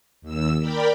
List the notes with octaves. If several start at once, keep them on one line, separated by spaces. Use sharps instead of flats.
D#2 E6
A#4 D5 G5 B5